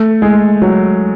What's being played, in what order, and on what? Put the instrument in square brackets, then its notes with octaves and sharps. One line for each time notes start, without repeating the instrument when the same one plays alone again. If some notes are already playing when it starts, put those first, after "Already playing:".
Already playing: [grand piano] A3
G#3
F#3